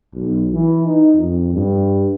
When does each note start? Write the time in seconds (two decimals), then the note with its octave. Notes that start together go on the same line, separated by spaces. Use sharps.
0.14 B1
0.53 E3
0.86 D#4
1.15 F2
1.54 G2